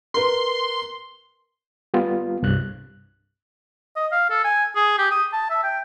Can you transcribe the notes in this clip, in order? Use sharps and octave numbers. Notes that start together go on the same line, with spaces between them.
A#4 B4 C6
G3 B3 F4 F5
C2 G2 F#6
D#5
F5
A4
G#5
G#4
G4
D#6
A5
E5
G5